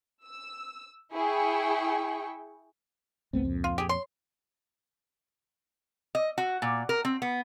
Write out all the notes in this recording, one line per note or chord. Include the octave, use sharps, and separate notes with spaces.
E6
E4 G#4 G5 C#6
G#1 C#2 A3 B3 C4
F2 A#2
F4
G4 G#4
C#5 C6
D#5
F#4
A#2
A#4
C4
B3